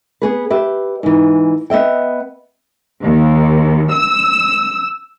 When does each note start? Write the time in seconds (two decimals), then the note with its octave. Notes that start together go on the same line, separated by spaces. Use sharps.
0.22 B3 G#4 B4
0.50 G4 B4 E5
1.03 G#2 E3
1.70 B3 D#5 E5 G5
3.03 D#2
3.93 E6